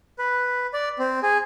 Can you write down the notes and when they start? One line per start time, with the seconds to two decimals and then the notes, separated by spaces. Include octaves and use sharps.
0.19 B4
0.73 D5
0.99 C4
1.23 G#4